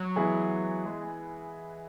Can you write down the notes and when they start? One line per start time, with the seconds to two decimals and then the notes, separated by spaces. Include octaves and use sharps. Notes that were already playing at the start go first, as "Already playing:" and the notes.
Already playing: F#3
0.16 E3 G#3 B3 E4 G#4
0.86 G#3